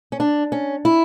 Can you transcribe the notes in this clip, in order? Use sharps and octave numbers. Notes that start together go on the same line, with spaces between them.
C#4
D4
C#4
E4